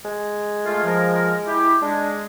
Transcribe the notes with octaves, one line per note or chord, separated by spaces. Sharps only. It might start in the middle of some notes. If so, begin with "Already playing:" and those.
G#3
A3 F4
F3 A#4
E4 G4
G#3 D4